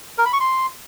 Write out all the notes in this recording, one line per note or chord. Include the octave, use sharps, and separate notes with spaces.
A#4
B5
C#6
C6